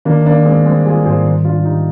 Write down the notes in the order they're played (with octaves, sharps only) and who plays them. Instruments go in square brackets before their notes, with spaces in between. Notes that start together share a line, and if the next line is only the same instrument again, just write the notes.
[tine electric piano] D#3 [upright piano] A#3 D4
[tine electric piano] D#3 [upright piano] A#3 D4
[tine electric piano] G#1 [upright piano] G#3 C4
[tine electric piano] G3 [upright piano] G#3 C4
[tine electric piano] G3 [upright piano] F4 G#4
[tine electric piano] G#2 [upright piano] G#4 C5
[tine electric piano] D#3
[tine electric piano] G#1 [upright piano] D4 F4
[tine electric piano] G#1 [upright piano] D#4 G4